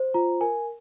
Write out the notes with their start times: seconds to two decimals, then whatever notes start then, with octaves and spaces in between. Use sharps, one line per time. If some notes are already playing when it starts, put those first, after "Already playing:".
Already playing: C5
0.14 F4 A#5
0.41 A#4 G#5